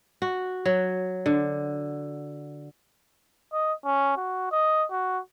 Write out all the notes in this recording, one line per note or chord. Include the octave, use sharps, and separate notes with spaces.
F#4
F#3
D3
D#5
C#4
F#4
D#5
F#4